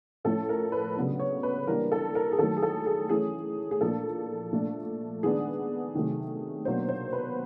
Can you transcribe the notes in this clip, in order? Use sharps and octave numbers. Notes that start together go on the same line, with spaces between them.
A2 F3 A3 C#4 A4
A#4
B4
C#3 F#3 B3 D4
C#5
B4
E3 G3 A#3 D4 A#4
A4
A#4
G#4
D#3 F#3 A3 A4
G#4
A4
G#4
E3 A3 C#4 G#4
G#4
A#2 F3 A#3 D4 A4
A#2 F3 A3 D4
D#3 G#3 B3 D4 G#4
C3 D#3 F#3 A3
B2 F#3 A#3 D4 C5
C5
B4